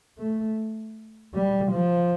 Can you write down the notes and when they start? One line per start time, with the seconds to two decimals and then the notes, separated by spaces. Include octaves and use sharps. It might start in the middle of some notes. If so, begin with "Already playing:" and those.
0.19 A3
1.34 G3
1.71 F3